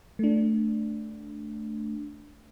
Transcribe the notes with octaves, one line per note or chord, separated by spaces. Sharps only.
A3 D4